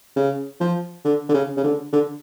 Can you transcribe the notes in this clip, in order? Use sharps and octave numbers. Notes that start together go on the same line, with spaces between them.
C#3
F3
D3
D3
C#3
C#3
D3
D3